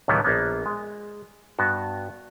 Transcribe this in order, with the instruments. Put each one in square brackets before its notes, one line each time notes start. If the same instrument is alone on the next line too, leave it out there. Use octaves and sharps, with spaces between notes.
[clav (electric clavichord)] C#2 A2 D#3 E3 G3 B3
A#1 A#3 B3
G#3
G2 B3 F#4